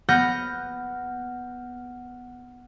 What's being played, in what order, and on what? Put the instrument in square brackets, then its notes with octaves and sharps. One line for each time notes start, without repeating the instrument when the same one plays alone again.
[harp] B3 F#5 F6 G6 A#6